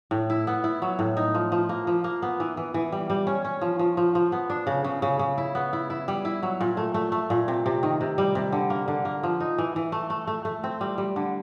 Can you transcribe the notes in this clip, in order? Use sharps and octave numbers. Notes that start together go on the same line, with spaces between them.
A2
E4
B3
E4
F#3
A2
D#4
F3
F3
A#3
F3
A#3
B3
E3
E3
E3
G3
G3
C#4
C#4
F3
F3
F3
F3
B3
D4
C#3
C#3
C#3
C#3
E4
B3
E4
E4
G3
E4
F#3
A#2
A3
A3
A3
A#2
C3
C3
D#3
C3
G3
C3
D3
A#3
D3
A#3
F3
D#4
E3
E3
A3
A3
A3
A3
C4
G3
G3
D3